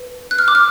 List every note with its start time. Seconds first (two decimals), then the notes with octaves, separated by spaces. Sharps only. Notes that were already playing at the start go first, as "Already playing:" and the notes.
Already playing: B4
0.31 F#6
0.39 F6
0.48 D6
0.55 F6